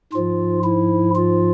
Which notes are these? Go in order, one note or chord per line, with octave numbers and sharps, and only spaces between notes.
G#2 F3 F4
E4
F4